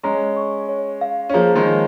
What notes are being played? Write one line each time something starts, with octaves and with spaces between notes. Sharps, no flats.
G#3 C#4 A#5
C#6
C#5
F5
C#4
F3 A#3 G#4
D#3 G#3
C#5